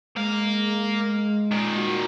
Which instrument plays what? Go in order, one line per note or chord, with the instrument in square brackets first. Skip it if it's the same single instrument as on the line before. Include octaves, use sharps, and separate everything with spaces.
[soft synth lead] G#3 [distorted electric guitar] A#3 F5
[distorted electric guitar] A#2 D#3
[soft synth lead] F#4